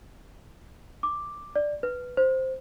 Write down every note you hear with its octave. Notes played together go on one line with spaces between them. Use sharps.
D6
D5
B4
C5